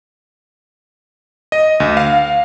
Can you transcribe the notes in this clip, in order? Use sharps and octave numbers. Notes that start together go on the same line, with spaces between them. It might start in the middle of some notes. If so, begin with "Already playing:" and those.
D#5
D2
F5